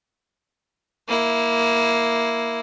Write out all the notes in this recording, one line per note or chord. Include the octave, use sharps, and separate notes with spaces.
A#3 E4